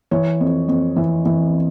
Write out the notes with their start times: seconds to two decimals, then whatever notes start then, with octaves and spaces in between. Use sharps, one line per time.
0.11 E3 C#5
0.40 F2
0.68 F2
0.96 E3
1.26 E3